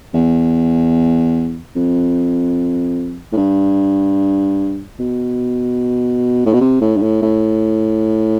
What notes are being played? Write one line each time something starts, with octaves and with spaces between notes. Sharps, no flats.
E2
F2
A2
G2
B2
A2
B2
C3
A2
G2
A2
A2